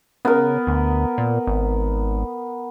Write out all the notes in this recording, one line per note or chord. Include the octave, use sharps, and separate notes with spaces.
C#3 B3 A#4
D2
A#2
G#1